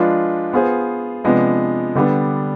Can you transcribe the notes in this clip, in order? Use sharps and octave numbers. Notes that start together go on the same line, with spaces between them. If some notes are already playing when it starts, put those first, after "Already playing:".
Already playing: F3 G#3 D4 F4 B4
B3 F4 G#4 C5
C3 F3 G#3 B3 D4
D3 G3 B3 D4